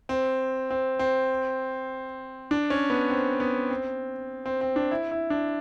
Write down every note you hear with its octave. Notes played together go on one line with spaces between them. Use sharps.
C4
C4
C4
D4
C#4
B3
C4
B3
C4
C4
C4
D4
E4
E4
D4